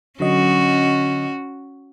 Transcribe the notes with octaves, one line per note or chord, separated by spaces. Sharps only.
D3 F#3 C#4 F#4 D#5